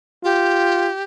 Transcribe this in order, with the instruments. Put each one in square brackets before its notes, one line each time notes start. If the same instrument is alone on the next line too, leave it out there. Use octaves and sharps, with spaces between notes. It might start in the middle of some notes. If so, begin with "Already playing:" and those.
[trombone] F4 [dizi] G4